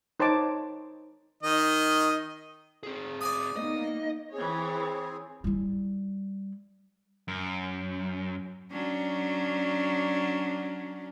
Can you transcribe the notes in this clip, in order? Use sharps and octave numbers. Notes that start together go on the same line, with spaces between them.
D#4 C5 C#5 A5 D6
D#3 D#5
C4 G#4
D5 G#5 D#6
A#3 B3 D#4 D#5
E3 C4 G#4 C#5
G3 E4
F#2
F#3 C#4 D4